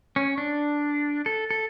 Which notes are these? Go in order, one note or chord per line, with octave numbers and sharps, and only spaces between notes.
C#4
D4
A4
A4